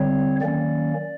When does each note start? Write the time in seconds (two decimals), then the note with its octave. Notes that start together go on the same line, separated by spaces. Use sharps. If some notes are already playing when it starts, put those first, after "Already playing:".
Already playing: D3 G3 C4 C#5
0.41 D#3 F#3 A#3 C#4 D5